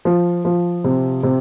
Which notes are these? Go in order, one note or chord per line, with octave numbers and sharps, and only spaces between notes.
F3
F3
C3
C3